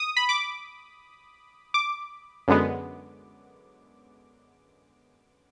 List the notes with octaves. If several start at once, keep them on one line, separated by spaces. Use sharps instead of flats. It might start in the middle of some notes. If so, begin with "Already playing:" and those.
Already playing: D#6
B5
D6
D6
F#2 D3 G#3 B3